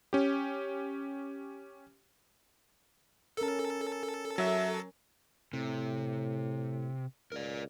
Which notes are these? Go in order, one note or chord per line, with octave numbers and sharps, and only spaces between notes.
C#4 G4
C#4 A4 A#4
F#3 E5
A2 C3
C#2 A#4 D5